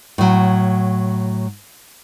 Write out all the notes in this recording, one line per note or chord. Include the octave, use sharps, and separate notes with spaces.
A2 F#3